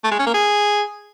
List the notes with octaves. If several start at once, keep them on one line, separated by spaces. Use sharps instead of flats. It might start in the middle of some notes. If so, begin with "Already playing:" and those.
A3
G#3
C#4
A#3
G#4